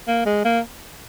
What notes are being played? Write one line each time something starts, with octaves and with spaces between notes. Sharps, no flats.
A#3
G#3
A#3